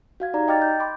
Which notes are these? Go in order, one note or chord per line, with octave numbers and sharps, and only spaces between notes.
F#4 F5 G#6
D#4 G4 D5 A#5
D#5 G5 D6 F6 A6
G6
B5 C6 D6